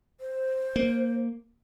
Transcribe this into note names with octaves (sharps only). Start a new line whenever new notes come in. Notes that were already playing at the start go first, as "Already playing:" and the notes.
C5
A#3